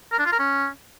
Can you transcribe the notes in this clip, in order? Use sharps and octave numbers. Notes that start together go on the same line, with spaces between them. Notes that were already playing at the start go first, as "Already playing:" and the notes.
A#4
D4
F4
A#4
C#4